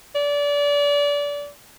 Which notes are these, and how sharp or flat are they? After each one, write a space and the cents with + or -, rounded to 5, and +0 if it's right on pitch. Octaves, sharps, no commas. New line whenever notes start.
D5 -30